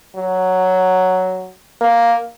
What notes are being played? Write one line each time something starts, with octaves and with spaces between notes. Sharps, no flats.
F#3
A#3